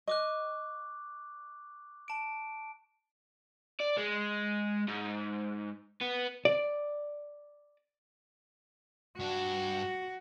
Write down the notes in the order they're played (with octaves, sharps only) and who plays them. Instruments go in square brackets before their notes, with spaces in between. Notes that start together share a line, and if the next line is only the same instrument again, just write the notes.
[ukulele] D#5 [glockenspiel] C#6 D6 F#6
[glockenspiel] A5 D7
[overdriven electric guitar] D5
G#3
G#2
B3
[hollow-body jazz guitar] D5
[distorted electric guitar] G2 D4 [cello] F#4